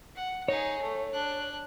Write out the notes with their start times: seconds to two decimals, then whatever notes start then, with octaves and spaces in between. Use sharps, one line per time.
0.15 F#5
0.48 D#4 G#4 C#5
0.81 A3
1.13 D4 F#6